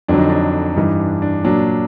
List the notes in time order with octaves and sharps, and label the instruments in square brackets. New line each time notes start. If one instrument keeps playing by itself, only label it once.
[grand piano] F2 D3 F#3 D4
D#4
D4
G2 E3 D#4
D4
D4
A#2 F#3 D4